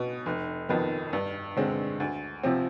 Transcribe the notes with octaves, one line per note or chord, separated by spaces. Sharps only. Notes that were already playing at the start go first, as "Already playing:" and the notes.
Already playing: B2 B3
F1
F2 D#3 B3
G2
D3 G#3 C4
D2
C3 F3 C4